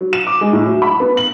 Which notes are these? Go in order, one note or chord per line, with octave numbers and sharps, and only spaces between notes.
F#3
E7
D6
G#3
A2
F#3
B5
B3
F#7